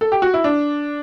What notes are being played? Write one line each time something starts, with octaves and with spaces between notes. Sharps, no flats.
A4
G4
F#4
E4
D4